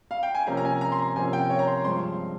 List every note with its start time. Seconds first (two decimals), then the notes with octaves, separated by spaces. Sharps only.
0.11 F5
0.23 G5
0.35 G#5
0.47 C3 F3 A#3 C#4 A#5
0.57 A#5
0.65 G#5
0.81 A#5
0.92 C6
0.99 A#5
1.16 C3 F3 A#3 C#4 G#5
1.33 G5
1.50 C#5
1.59 A#5
1.68 C6
1.84 G2 F3 G#3 C4 C6